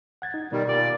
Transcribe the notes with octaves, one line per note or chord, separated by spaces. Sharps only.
F#5 G#6 A6
D#4
B2 D#3 G3
A#2 D5